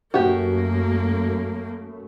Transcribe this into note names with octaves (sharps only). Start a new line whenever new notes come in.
F#2 A3 A#3 F#4 G4